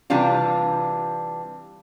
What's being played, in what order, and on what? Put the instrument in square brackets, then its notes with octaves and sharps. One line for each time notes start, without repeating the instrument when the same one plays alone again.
[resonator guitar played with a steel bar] C3 E3 G3 D4 F4